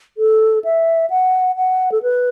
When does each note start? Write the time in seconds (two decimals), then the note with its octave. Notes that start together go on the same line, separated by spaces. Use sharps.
0.18 A4
0.64 E5
1.10 F#5
1.57 F#5
1.92 A4
2.03 B4